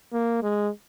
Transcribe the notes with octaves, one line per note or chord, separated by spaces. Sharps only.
A#3
G#3